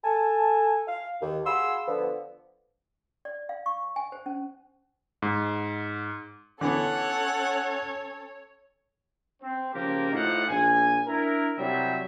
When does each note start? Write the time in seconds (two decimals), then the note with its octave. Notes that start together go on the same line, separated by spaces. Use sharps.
0.04 A4 G#5 A5
0.87 F5
1.22 D#2
1.46 F#4 G#4 F5 B5 C6 E6
1.87 D3 F3 B3
3.25 D5
3.49 F5
3.66 C#6
3.96 G#5
4.12 C5
4.26 C#4
5.22 G#2
6.61 D3 E3 B3 C#4 A4 C#5 F#5
9.42 C4
9.74 C#3 F3 A#3 G4 A#4
10.13 A2 D#4 F4 C5 F#5
10.48 A#1 G#5
11.07 D4 E4 A#4
11.58 C2 F#3 G3 C4 E5